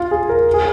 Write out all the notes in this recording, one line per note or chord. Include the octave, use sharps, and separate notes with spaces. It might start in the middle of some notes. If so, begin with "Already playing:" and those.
Already playing: F4
G#4
A#4
G#4